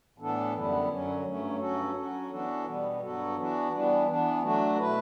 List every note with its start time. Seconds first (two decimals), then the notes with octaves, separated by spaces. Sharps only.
0.18 A2 E3 B3 D4 A4
0.53 F#2 D3 G3 B3 E4
0.89 F#2 D3 F#3 C#4
1.24 G2 F#3 A3 C#4
1.60 G2 F#3 C#4 F#4 A4
1.95 F#3 C#4 F#4
2.30 E3 B3 D4 F#4 A4
2.66 B2 G3 B3
3.01 G2 F#3 B3 F#4 A4
3.36 E3 B3 D4 F#4
3.72 E3 G3 B3 D4
4.07 E3 B3 D4
4.43 F#3 A3 D4 F#4
4.78 B2 A3 E4 B4